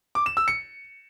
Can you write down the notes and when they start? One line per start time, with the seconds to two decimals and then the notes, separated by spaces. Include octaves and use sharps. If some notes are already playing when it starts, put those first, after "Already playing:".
0.15 D6
0.26 E7
0.37 E6
0.48 C#7